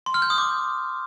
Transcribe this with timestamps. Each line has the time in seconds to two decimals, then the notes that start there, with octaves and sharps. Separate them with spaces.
0.06 C6
0.14 F6
0.22 G6
0.30 D#6
0.38 D6